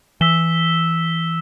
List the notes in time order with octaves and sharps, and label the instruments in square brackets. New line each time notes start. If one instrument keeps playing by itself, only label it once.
[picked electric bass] E3 [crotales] E6 B6 E7 G7